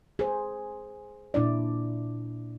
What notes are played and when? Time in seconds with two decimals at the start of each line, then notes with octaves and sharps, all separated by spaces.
0.19 G#4 C5
1.34 A#2 D4 E4 D5